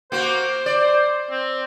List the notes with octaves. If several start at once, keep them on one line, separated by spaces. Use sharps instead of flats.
A#3 F#4 C5
D5
C4